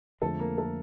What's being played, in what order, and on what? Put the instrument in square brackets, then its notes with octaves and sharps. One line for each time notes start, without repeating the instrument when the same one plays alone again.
[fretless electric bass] F2 D3 F3 G#3 [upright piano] A3 A4
[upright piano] A#3 A#4
A3 A4